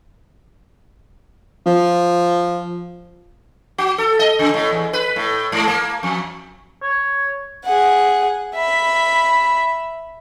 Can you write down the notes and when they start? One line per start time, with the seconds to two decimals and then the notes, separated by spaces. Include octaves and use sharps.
1.66 F3
3.78 F#4
3.98 A4
4.19 D#5
4.39 C#3
4.54 A2
4.70 E2
4.93 B4
5.16 A2
5.52 G#2
5.68 A#3
6.03 F2
6.82 C#5
7.65 G#4 F#5
8.55 E5 B5